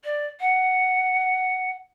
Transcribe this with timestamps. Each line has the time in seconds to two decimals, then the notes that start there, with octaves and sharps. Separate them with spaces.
0.04 D5
0.41 F#5